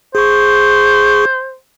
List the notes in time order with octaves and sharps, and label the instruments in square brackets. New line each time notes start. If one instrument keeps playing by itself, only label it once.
[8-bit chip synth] G#4 C#6 [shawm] C5